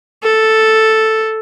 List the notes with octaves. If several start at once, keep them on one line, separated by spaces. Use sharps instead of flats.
A4